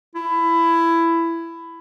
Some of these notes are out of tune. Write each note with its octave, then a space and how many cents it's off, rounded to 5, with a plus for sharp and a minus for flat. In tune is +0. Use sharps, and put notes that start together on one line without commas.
E4 +15